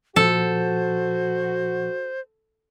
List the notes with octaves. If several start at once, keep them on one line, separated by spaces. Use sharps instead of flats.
A#2 F3 F#4 A4 C5